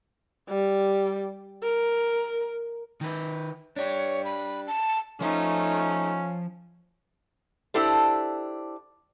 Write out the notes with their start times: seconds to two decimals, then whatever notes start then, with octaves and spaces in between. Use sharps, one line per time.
0.49 G3
1.63 A#4
3.01 D#3 B4
3.76 D4 G4 C#5
4.25 B5
4.67 A5
5.21 F3 A3 C#4 D#4 C5
7.74 D4 E4 G4 A4 C5